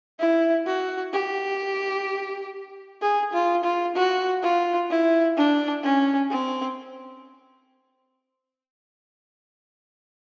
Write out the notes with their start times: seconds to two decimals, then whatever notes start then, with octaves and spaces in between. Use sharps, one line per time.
0.19 E4
0.66 F#4
1.13 G4
3.02 G#4
3.33 F4
3.64 F4
3.95 F#4
4.42 F4
4.90 E4
5.37 D4
5.83 C#4
6.30 C4